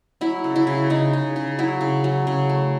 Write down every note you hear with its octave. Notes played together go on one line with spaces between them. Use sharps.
F#3 E4
C#3
E4
C#3
C#3 D#4
C#3
C#3
F#3 E4
C#3
F#3
C#3
A3